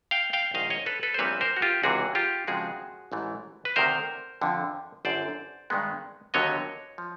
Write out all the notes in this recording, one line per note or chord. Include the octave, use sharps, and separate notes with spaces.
F5 G5
F5 G5
A#1 G#2 D#3 D#5 F5
C#5 D#5
A4 B4
A4 B4
C5
A#1 A#2 G3 C4 B4 C#5
A#4 C5
F#4
F4 G4
C#2 C3 E3 F#4 G#4
F4 G4
F2 C#3 F3 G#3 F#4 G#4
A1 G#2 E3 A3
B4
D2 C3 D#3 A#4 C5
F2 D3 F3
G1 F#2 D3 C5 D5
G2 D#3 G#3 B3
D#2 D3 F#3 B3 C#5 D#5
F3